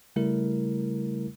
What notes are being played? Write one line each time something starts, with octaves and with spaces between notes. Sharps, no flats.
C#3 G3 A3 E4 A#4